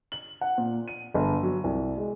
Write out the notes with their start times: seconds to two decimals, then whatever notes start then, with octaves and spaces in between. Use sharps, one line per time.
0.12 F#7
0.41 F#5
0.58 A#2
0.88 D#7
1.14 G1
1.43 F#3
1.64 C2
1.97 G#3